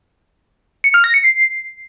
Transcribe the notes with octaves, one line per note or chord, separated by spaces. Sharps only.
C#7
F6
A#6
C#7
C7